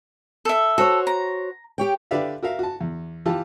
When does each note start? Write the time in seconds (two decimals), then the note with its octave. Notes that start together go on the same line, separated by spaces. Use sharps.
0.45 A4 E5
0.78 F#4 A4 C5 C#5
1.07 A#5
1.78 G4 C#5 G5
2.11 D3 G4 B4 D5 E5 F5
2.43 F#4 A#4 E5 F5
2.59 F#4 A5
2.81 E2
3.26 E3 F4 G4 A5